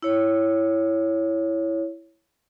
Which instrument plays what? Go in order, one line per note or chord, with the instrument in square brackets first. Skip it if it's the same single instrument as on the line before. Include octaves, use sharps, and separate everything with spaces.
[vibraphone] E4 C#5